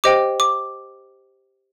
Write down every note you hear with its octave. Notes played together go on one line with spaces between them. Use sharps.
G4 C5 D#5 G5 D6
D6